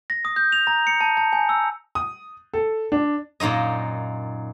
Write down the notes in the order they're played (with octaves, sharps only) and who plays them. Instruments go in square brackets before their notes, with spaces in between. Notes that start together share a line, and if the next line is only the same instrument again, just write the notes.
[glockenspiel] A#6
D#6
G6
F7
A#5
C#7
A5
A5
G#5
E6
[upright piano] D#6
A4
D4
[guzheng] F#2 A#2 D#4 D#5